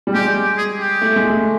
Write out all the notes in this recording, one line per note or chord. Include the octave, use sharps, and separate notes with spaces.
G3
G#3 G4
G#4
G4
A3
G#3
A3